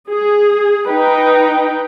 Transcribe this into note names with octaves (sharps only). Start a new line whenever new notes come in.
G#4
D#4 B4 G5